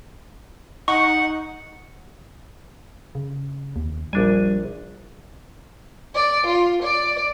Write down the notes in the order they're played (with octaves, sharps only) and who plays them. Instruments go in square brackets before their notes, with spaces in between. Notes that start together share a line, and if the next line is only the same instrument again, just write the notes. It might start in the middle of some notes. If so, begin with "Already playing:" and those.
[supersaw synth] D#4 [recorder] F#5 [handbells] C#6
[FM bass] C#3
D#2
[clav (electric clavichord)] A#1 D4 G#5 [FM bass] G3
[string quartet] D5
F4
D5